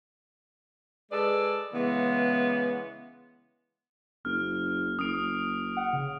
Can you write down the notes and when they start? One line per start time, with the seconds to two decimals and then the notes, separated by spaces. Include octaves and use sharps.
1.12 G#3 G#4 A4 B4 D5
1.74 C#3 E3 G#3 B3
4.25 F#1 F6
4.99 F#1 D#6 D7
5.77 F#5
5.93 C#3